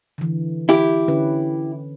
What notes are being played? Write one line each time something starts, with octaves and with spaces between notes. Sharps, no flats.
D3 E3
E4 G4
D3 C#4 B4